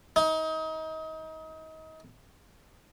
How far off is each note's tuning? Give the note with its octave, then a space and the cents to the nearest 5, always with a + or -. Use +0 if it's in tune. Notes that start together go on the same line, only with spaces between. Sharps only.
D#4 +30